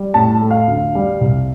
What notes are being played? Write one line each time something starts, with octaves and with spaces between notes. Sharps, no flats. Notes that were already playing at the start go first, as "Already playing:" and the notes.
Already playing: G3
A2 A5
A3
F5
D2
G3
C2